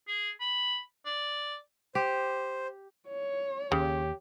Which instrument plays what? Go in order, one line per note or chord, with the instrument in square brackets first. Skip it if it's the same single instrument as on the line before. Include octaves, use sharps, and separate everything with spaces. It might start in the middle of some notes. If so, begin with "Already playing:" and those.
[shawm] G#4
B5
D5
[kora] G4 [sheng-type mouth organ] C5
[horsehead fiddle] C#5
[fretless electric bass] D#2 [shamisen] C#3 [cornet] G4